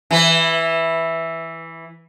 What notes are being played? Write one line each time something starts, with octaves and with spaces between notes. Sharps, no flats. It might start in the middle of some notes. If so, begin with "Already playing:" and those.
E3 B4